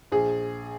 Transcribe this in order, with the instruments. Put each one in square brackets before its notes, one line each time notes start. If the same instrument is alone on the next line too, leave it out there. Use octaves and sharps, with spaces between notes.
[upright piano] A#1 G#4